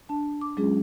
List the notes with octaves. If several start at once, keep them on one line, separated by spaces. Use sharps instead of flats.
D4 A5
D6
F#3 G#3 C#4 F4 G#4